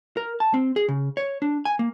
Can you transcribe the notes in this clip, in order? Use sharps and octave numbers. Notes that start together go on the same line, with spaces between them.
A#4
A5
C4
G#4
C#3
C#5
D4
G#5
A#3